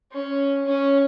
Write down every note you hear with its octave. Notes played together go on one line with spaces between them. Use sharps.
C#4
C#4